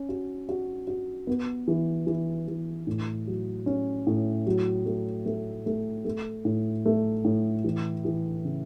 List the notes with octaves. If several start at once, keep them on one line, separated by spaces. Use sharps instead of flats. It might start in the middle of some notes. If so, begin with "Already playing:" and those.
Already playing: C#4
F#4
F#4
F#4
B3
E3
E3
E3
A2
F#3
C#4
A2
F#3
A3
A3
A3
A3
A2
A3
A2
E3
E3
C#3